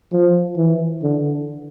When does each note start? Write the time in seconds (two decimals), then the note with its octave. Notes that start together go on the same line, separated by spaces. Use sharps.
0.13 F3
0.57 E3
1.03 D3